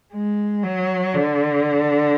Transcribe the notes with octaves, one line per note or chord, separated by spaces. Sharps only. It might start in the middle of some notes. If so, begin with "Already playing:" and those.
G#3
F#3
D3